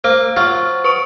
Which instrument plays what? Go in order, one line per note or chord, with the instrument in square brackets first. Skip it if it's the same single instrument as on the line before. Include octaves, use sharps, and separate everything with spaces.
[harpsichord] A#3 [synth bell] C5
[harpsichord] F#3 F4
[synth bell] B4 C#6 D7